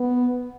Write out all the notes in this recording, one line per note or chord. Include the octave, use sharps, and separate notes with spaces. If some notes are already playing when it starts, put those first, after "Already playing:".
Already playing: B3